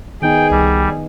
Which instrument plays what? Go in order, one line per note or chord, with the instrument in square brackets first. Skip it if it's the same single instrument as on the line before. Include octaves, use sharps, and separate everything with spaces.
[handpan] D#3 B3 D#4 [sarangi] G#4 [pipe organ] G5
[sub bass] C2 [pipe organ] G3